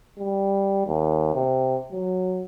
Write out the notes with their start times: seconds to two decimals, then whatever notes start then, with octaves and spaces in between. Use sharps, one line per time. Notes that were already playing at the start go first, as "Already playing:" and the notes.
0.18 G3
0.86 D#2
1.34 C3
1.92 F#3